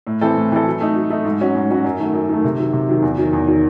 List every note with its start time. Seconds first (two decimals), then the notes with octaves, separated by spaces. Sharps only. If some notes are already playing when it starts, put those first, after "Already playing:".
0.07 A2
0.21 E3 C4 E4 A4
0.36 A2
0.52 E3 C4 E4 A4
0.66 F#3
0.81 A3 D#4
0.95 F#3
1.10 A3 D#4
1.25 G#2
1.41 F#3 C#4 F#4
1.55 G#2
1.70 F#3 C#4 F#4
1.84 F#2
1.99 D#3 A3
2.14 F#2
2.29 D#3 A3
2.44 C3
2.58 D#3 F#3
2.73 C3
2.89 D#3 F#3
3.02 E2
3.18 D#3 F#3
3.33 E2
3.48 D#3 F#3